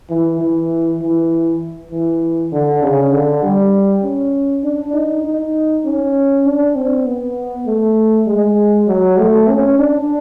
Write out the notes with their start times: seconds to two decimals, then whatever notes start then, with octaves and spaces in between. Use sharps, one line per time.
0.10 E3
0.40 E3
1.02 E3
1.91 E3
2.52 D3
2.82 C#3
3.12 D3
3.43 G3
4.03 C#4
4.64 D4
4.94 D#4
5.24 D#4
5.85 C#4
6.46 D4
6.76 C4
7.05 B3
7.67 A3
8.27 G#3
8.88 F#3
9.18 A3
9.48 C#4
9.79 D4